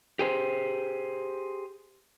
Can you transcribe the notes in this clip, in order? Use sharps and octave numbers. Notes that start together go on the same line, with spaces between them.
G4 G#4 C5